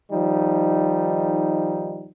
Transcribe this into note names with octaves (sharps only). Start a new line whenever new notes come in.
D#3 F3 G3 D#4